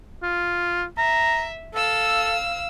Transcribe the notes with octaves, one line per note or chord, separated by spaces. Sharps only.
F4
E5 A#5
A4 F5 E6